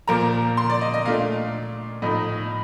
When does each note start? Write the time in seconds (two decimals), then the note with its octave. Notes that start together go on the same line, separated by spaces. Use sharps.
0.07 A#2 F3 A#3 A#5
0.57 C6
0.69 D5
0.81 D#5
0.94 D#5
1.05 A#2 A3 D4 F5
2.02 A2 F3 A3 D#4 D#5